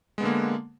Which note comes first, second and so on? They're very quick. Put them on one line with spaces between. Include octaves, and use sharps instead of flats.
G#3 B3 D3 A#3